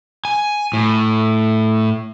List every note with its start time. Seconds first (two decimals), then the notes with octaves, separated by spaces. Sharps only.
0.25 G#5
0.73 A2